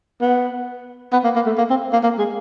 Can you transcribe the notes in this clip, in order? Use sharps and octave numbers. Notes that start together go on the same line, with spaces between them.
B3
B3
A#3
A#3
A3
A#3
C4
A#3
A#3
G#3